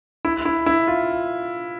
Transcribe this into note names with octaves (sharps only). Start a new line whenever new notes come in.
E4
E4
E4
F4